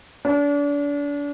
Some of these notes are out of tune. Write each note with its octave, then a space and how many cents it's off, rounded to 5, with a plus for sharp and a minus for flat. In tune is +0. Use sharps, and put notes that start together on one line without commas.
D4 -35